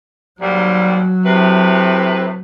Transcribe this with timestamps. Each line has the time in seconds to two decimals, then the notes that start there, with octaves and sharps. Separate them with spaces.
0.40 D#2 G#2 F#3 G3
1.25 A2 C3 B4